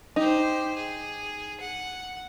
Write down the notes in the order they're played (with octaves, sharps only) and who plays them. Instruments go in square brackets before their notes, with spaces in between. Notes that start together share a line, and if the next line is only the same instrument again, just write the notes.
[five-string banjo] D#4 [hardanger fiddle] G4 C5
[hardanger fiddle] G#4
F#5